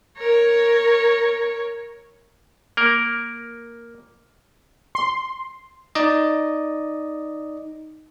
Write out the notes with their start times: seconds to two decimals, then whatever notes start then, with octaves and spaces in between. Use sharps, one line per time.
0.18 A#4 C#5
2.77 A#3 A#4
4.95 C6
5.95 D#4 D5 D#5